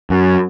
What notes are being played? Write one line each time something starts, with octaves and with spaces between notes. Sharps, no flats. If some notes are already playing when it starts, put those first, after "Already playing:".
F#2